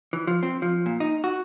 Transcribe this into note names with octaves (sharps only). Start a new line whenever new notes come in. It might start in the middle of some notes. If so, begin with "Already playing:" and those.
E3
F3
C4
F3
A#2
D#4
F#4